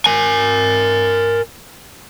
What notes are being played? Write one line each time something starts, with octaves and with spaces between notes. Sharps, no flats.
A#4 G#5